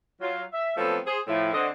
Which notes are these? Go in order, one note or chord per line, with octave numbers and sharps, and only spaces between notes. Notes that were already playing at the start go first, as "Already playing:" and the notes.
F#3 F4
E5
F3 F#3 A3 B3 C4 A4
G#4 C5
A2 F3 E4
D3 C4 D#5